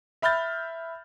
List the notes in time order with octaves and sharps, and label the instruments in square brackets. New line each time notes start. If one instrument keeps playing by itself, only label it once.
[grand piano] E5 B5 F6 G6 A6